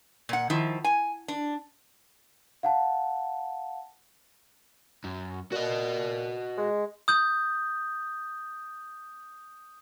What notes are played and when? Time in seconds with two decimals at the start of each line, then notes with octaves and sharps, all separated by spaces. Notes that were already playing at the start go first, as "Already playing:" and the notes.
0.29 A#2 F#5
0.50 D#3 F3 E4
0.84 G#5
1.28 D4
2.63 F5 F#5 A5
5.04 F#2
5.52 A#2 F#4 D#5
6.57 G#3
7.08 D#6 G6